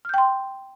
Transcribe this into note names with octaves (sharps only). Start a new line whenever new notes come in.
G5 C6 F6 G6